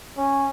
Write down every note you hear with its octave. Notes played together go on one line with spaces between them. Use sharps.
C#4